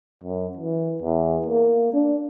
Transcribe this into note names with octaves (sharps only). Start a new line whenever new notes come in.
F#2
E3
E2
A#3
D4